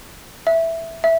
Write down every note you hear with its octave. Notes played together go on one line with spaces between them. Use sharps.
E5
E5